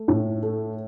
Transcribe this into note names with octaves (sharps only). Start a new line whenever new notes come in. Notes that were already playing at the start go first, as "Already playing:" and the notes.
Already playing: A3
A2
A3